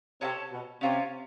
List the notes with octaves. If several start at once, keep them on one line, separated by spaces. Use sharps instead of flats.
C3 C#4 F4 A4 C#5
B2
C3 C#4 F4 A4 C#5